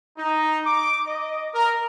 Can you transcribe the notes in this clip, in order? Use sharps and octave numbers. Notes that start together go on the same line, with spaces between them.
D#4
D6
D#5
A#4